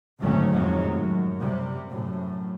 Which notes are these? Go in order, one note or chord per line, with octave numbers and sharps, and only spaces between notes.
G#1 D2 D#3 F#3 A3 C#4
F2 A2 C3 D#3 F#3 G#3
F#2
C3 G3
F#2 A2